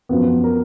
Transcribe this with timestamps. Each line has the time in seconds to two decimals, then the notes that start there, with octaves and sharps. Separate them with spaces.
0.09 F#2 F3 B3
0.44 A#4